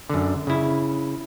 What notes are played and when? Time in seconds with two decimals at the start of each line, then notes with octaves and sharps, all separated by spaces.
0.10 F#2 D3
0.47 C#3 E4